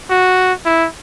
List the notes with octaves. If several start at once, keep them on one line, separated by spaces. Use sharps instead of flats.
F#4
E4